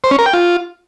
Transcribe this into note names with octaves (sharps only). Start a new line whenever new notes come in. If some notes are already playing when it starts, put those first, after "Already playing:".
C5
C#4
A#4
G5
F4